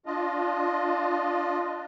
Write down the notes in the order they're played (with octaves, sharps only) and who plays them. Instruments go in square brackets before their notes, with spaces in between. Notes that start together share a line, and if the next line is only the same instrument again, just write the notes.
[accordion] D4 F4 D#5